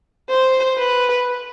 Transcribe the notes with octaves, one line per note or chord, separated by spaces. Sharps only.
C5
B4